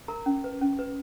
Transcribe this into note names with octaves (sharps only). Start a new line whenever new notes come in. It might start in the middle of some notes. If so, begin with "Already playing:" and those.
A#4 A#5
C#4
B4
C#4
B4